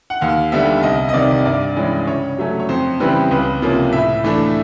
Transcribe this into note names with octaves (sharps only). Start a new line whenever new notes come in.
F#5
D#2 F5
D3 G3 B3 E5
C2 D#5
D#5
C3 D#3 D5
G2 D5
E3 G#3 C#4
C#3 C#5
F#3 A3 C#4
C#5
F2 C5
C#3 E3 G3 C4 B4
C#2 B4
C3 F3 A#3 C#4
A2 E5
E3 A3 D4